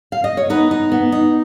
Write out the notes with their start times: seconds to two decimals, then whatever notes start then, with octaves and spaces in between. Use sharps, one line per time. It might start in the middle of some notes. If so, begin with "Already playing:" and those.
0.12 F5
0.24 D#5
0.37 C#5
0.50 B3 D#4 B4
0.71 D#4
0.92 B3
1.12 D#4